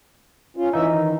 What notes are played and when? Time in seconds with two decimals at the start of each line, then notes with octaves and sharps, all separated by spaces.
0.57 C#4 F4
0.73 E3 C#4 D#4 E5
0.90 D#3